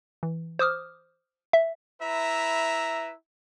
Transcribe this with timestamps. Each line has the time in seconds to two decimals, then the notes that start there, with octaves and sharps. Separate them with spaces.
0.23 E3
0.59 C5 D6 D#6 F6
1.53 E5
2.02 E4 B4 E5 A#5